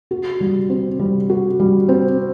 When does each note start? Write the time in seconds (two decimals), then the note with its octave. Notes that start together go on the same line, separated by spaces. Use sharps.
0.11 F#4
0.40 G3
0.70 C4
0.99 G3
1.30 F#4
1.60 G3
1.89 C4